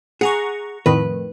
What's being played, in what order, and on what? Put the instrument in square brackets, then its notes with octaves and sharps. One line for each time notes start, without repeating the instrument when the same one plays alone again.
[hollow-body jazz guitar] G#4 [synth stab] F#5 A#5 C#6
[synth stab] F2 A2 D#3 [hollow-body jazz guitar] B4